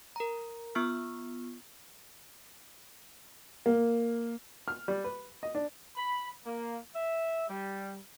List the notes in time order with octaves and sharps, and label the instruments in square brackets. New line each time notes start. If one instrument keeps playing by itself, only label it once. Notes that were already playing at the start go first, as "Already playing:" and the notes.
[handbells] A#4 A#5
B3 F4 C#6 E6 F6
[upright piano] A#3
[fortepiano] F6
G3
B4
D#5
D4
[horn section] B5
A#3
E5
G3